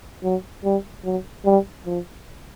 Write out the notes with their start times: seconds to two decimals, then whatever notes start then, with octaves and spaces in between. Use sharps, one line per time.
0.23 F#3
0.64 G3
1.04 F#3
1.45 G3
1.86 F3